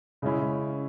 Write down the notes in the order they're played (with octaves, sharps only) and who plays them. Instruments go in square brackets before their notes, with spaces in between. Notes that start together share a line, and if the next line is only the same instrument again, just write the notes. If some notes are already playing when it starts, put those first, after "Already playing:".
[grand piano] C#3 G#3 C#4 E4